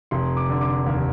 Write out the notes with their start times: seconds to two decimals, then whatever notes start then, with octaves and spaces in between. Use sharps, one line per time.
0.11 F1 C6
0.37 D6
0.49 D3
0.61 D6
0.86 D#2